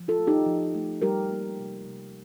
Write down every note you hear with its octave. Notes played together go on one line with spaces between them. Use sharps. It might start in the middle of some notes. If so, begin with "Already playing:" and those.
Already playing: F3
F4 A4
A3
D#4 G4
F3
A3
G3 G4 A#4
A#3
C3
C3